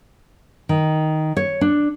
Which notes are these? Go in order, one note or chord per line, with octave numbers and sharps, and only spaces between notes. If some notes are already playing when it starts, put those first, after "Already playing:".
D#3
C#5
D4